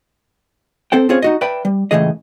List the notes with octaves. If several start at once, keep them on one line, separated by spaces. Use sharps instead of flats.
C4 A4 C5 G5
C4 C#4 F4 G#4 C#5
D#4 F#4 D#5
B4 D5 E5 G5 A5 B5
G3
C#2 F#2 A2 E3 G#4 D#5